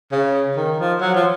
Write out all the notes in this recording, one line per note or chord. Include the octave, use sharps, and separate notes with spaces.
C#3
D#3
F3
F#3
F3